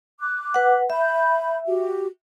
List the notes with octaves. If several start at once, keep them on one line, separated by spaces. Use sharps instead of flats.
D6 F#6
B4 F#5
E5 B5 G6
F#4 G4